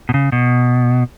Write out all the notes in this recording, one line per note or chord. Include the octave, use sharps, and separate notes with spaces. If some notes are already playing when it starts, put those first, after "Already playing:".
B2
C#3
B2